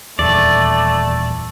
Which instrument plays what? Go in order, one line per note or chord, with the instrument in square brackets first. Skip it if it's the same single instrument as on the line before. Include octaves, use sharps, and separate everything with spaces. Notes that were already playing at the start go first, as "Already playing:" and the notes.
[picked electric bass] D#1 E2 [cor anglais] A3 [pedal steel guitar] D5